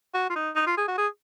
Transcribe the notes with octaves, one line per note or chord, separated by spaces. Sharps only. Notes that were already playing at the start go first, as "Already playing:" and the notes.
F#4
F4
D#4
D#4
F4
G#4
F#4
G#4